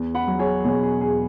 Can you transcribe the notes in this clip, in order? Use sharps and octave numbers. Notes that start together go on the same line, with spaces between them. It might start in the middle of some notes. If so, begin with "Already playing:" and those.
Already playing: E2
F#5 B5
F#3
G#4 C#5
B2 G#4 C#5
G#4
E2 G#4